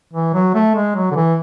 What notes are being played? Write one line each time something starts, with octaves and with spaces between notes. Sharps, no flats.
E3
F#3
A3
G#3
F#3
D3
E3